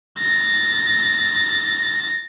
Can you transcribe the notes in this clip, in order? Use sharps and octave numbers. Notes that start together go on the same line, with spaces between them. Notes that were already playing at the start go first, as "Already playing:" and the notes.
A6 A#6